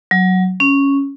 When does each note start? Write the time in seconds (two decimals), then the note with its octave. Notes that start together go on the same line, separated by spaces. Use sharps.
0.11 F#3
0.60 C#4